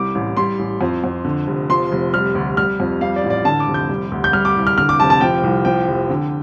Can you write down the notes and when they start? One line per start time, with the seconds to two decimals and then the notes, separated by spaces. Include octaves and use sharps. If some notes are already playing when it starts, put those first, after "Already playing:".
Already playing: C2 G3 D6
0.15 A1
0.37 G3 C6
0.59 A1
0.81 F2
1.04 F2
1.25 D3
1.47 F1
1.70 F3 C6
1.92 F1
2.13 G3 F6
2.35 D2
2.57 G3 F6
2.80 F2
3.01 G3 F5
3.16 D5
3.24 A1
3.30 D5
3.45 D3 A5
3.60 D6
3.67 F1
3.74 G6
3.89 G3
4.12 D2
4.24 G6
4.33 G3 F6
4.45 D6
4.56 C2
4.67 F6
4.78 D3 F6
4.89 D6
5.00 F1 A5
5.10 A5
5.21 F3 G5
5.43 C2
5.65 F3 G5
5.88 F1
6.10 D3